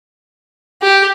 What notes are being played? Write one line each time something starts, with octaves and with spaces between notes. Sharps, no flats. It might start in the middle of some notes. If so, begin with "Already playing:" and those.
G4